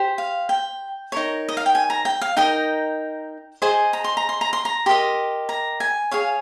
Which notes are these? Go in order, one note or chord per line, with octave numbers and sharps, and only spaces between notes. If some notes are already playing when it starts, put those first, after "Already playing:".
Already playing: G4 C5
F5
G5
D#4 A#4 C#5
D#5
F5
G5
G#5
A#5
G5
F5
D#4 A#4 D#5 G5
G#4 C5 D#5 G#5
A#5
C6
A#5
C6
A#5
C6
A#5
G4 A#4 D#5 C6
A#5
G#5
G#4 C#5 F5